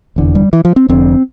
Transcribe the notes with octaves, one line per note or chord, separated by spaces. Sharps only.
F1 E2 D3
G3
E3
F3
C4
F1 F2 D3 C4